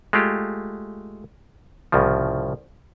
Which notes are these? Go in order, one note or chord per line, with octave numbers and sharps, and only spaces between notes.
G#3 A3 F4 G4
C2 A2 C#3 F3